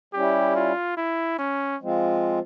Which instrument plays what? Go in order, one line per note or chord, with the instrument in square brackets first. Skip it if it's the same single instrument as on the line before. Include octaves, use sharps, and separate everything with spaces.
[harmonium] G3 C#4 E4 [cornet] G4
[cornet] F4
E4
C#4
[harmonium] F3 G#3 C4 F4